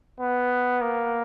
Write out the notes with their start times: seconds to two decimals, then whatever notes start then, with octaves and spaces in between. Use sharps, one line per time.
0.20 B3
0.82 A#3